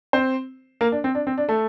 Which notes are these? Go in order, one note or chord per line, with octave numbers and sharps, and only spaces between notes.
C4 C5
A#3 A#4
D4
C4
D4
C4
D4
A3 A4